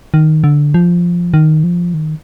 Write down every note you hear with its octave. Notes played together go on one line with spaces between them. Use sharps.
D#3
D3
F3
D#3
F3
D#3